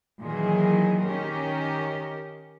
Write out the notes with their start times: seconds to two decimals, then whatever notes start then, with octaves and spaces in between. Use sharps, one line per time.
0.20 A#2 D#3 E3 F#3 G#4
1.05 D#3 C#4 G4 A#4